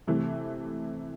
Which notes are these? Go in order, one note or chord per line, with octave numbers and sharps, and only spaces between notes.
C3 E3 A3